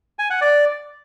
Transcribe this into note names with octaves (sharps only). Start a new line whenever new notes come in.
G#5
F#5
D5